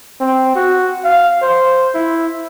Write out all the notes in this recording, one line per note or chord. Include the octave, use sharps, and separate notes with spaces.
C4
F#4
F5
C5
E4